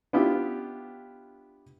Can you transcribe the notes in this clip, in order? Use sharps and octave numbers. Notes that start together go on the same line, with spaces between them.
B3 D4 E4 F4 G4